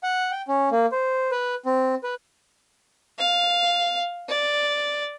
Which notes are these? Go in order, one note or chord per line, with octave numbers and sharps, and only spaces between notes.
F#5
G5
C#4
A#3
C5
B4
C4
B4
F5
D5